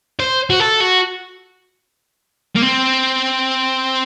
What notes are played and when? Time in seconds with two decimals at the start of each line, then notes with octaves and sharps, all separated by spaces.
0.20 C5
0.50 F#4
0.60 A4
0.81 F#4
2.56 A#3
2.62 C4